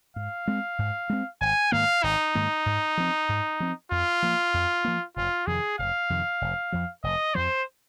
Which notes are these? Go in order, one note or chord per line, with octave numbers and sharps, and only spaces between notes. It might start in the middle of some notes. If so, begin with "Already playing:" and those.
G#2 F5
G#3 C4
G#2
G#3 C4
G#1 G#5
G#2 D#3 A#3 F5
G#1 D#4
G#2 D#3 A#3
G#2
F3 C4
G#2
F3 C4
F2 F4
F3 A#3
F2
F3 A#3
F1 F4
F2 C3 D#3 G#4
F1 F5
F2 C3 D#3
F1
F2 F3
F1 D#5
F2 F3 C5